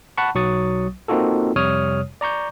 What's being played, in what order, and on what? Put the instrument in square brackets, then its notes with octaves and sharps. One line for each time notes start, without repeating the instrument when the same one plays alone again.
[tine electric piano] F#5 A5 B5 C#6
B1 F#3 C#6 D#6 A6
A#3 C4 D#4 F4 F#4 A4
F2 C3 G3 C#5 D#6 F6
D5 A#5 C#6 G6